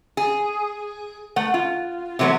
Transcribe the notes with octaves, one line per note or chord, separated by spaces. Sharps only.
G#4
A3 F#5
F4
C3 E3 F#3 A3 B3